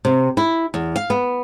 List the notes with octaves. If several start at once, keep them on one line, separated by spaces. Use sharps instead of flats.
C3
E4
E2
F5
B3